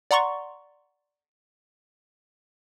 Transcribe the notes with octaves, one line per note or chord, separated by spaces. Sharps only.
D5 F#5 A#5 C6 C#6